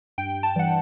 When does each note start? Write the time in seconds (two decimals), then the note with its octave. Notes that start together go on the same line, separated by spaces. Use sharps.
0.18 G2 G5
0.43 A5
0.56 E3 G3 F#5